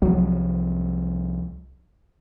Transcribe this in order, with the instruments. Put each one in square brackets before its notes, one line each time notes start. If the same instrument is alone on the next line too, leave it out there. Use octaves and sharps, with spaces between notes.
[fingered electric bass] C2 F3 [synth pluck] F#3